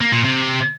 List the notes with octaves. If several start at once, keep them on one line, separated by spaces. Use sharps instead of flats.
A#3
A#2
C3